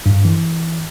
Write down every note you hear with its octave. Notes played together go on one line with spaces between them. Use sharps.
G2
E3